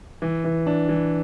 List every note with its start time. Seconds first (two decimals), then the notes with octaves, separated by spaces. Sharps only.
0.22 E3
0.44 E3
0.67 D4
0.89 E3